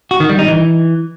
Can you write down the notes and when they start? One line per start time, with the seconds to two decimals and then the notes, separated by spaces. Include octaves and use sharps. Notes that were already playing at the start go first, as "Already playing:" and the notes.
0.11 F#4
0.20 D#3
0.29 G3
0.39 D#4
0.48 E3